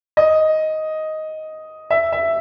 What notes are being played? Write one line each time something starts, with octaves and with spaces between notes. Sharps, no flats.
D#5
E5
E5